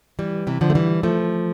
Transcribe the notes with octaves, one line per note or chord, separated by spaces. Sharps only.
E3 G3
C3 E3
D3 F3
A3
E3 G3
F3 A3